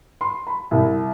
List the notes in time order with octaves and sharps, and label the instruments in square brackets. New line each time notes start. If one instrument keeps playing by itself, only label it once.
[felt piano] C6
B5
C2